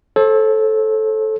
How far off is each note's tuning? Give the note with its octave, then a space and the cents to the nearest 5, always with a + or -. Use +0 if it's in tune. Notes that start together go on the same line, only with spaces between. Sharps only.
A4 -10 C5 +45